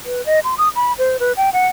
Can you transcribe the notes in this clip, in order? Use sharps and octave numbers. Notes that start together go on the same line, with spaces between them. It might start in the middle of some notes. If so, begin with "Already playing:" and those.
B4
D#5
C6
D#6
B5
C5
B4
G5
F#5